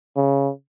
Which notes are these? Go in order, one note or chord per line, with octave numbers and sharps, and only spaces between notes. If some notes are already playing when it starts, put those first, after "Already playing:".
C#3